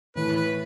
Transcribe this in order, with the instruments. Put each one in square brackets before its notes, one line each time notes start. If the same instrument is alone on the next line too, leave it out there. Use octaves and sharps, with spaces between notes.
[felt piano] A2 E3 A3 E4 [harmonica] B4
[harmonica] B4